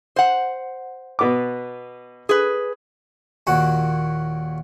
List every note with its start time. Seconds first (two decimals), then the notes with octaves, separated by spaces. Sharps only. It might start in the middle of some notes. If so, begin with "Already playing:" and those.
0.16 C5 F#5
1.19 B2 B3 D6
2.29 G#4 B4
3.47 D#2 A#2 F#4 F#5